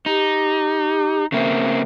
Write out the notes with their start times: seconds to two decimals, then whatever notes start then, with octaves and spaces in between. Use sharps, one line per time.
0.06 D#4 G4
1.32 C#3 A#3 C4 E5